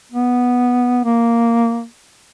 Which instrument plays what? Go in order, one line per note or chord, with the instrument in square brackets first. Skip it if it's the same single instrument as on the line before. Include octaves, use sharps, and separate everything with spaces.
[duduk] B3
A#3